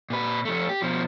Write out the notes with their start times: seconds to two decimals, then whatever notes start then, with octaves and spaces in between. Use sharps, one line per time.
0.10 A#2 B4
0.45 F2 A3
0.69 G4
0.82 B2 F3